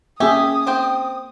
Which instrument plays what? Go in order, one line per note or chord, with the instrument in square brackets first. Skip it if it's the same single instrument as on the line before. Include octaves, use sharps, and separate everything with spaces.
[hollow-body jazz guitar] A#3 C#4 C6 [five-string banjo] G4 G#5 [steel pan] G#4 E5 [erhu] D#6
[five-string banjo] C4 C5 G5